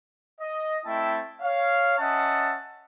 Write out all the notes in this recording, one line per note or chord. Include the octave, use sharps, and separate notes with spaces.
D#5
A3 C4 E4 E5 G5 A5
C#5 F5
C#4 D#5 E5 F#5 A5